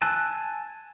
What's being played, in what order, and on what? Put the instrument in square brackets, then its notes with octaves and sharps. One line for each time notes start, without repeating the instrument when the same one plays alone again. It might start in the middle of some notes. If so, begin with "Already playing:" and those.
[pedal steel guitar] G#5 A5 E6 F#6